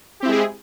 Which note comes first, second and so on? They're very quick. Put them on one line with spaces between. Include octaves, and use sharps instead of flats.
G4 C4 E4 G#3 G#4